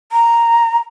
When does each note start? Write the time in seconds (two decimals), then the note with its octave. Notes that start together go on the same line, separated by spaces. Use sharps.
0.12 A#5